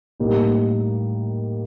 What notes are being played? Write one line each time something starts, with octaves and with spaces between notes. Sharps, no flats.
A2 G3 A#3 D#4